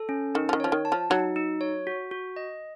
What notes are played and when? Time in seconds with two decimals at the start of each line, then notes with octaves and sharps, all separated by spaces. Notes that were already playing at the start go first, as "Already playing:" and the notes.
Already playing: A4
0.09 C#4
0.35 D#3 D#4
0.49 F3
0.53 D#3
0.60 F3 C#5
0.72 D#3
0.85 A5
0.92 F3
1.10 F#3 D#4
1.36 D#4
1.61 C#5
1.87 F#4
2.11 F#4
2.36 D#5